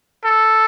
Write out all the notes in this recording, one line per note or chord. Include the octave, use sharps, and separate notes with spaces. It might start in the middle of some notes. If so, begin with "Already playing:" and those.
A4